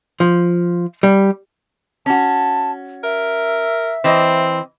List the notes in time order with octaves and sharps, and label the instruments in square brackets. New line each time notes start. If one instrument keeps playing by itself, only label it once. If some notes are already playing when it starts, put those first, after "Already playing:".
[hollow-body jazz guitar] F3
G3
[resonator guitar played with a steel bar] C#4 F#4 [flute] A5
[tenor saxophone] A#4 [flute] E5
[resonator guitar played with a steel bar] E3 D#5 [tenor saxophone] C4